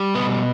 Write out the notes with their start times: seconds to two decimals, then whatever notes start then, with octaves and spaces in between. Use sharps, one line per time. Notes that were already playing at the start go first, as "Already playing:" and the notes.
Already playing: G3
0.15 B2 B3